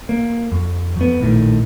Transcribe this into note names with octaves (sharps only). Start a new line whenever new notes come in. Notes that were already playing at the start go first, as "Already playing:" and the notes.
A#3
F2
F2 B3
A#1 A2 D#3